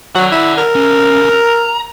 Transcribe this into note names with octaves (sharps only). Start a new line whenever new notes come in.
F#3 D5 F#5
E4
A#4
D3 C#4
A#5